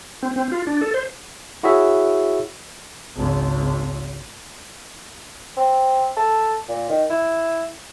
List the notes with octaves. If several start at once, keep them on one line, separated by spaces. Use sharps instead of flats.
C4
C4
F4
D4
A4
C5
E4 F#4 G#4 C#5 E5
G#1 C#2
C4
A4
A#2
D#3
E4